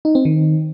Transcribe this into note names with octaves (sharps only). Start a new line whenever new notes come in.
D#4
C4
D#3